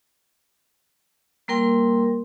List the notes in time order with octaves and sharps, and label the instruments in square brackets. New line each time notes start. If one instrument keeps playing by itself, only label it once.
[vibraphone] G3 A#3 A#4 G5 C6